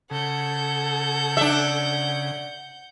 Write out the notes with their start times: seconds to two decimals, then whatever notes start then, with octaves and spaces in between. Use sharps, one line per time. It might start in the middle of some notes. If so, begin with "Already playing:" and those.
0.11 C#3 A4 F#5 G6
1.37 D4 E5